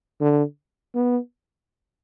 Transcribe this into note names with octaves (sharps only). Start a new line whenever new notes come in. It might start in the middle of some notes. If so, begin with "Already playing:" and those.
D3
B3